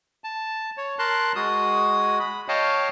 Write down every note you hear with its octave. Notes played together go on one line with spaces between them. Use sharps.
A5
C#5
A#4 A5 C6 F#6
G#3 F#4 D#6
B5
C#5 D#5 F5 G5 A5